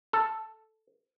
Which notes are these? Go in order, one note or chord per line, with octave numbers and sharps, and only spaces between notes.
A4